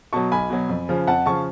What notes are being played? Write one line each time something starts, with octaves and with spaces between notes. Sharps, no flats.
B2 F#3 A5 C#6
B1 G#5 B5
B2 F#3
F2
C#3 F3
F2 F#5 A5
C#3 F3 A5 C#6